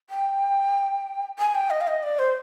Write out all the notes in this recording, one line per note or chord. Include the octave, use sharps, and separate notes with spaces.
G5
G#5
G5
D#5
F5
D#5
D5
C5